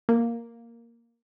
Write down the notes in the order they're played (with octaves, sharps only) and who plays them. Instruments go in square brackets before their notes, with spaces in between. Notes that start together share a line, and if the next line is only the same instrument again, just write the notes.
[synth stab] A#3